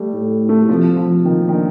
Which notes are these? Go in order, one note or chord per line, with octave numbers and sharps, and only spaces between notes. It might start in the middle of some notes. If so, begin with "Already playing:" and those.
Already playing: G3 A3
A2
A3
G3
C3 F3
F3
A#2 D#3
D#3
D3